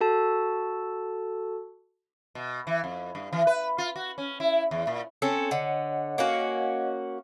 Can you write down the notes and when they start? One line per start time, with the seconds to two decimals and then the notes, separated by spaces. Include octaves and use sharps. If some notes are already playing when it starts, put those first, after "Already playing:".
0.01 F#4 A4 A5
2.35 B2
2.67 E3
2.84 F2
3.15 G2
3.33 E3
3.47 B4
3.78 F4
3.96 F#4
4.18 C#4
4.40 E4
4.71 E2
4.87 A#2
5.22 C4 C#4 A4
5.51 D3 C#5 D#5 F#5
6.18 A#3 C#4 F#4